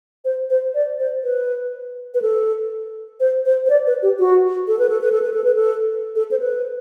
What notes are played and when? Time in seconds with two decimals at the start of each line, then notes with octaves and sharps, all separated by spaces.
0.25 C5
0.50 C5
0.74 D5
1.00 C5
1.24 B4
2.14 B4
2.22 A4
3.20 C5
3.46 C5
3.66 C5
3.70 D5
3.87 B4
4.03 G4
4.19 F#4
4.68 A4
4.79 B4
4.89 A4
5.01 B4
5.12 A4
5.22 B4
5.33 A4
5.44 B4
5.55 A4
6.16 A4
6.31 C5
6.40 B4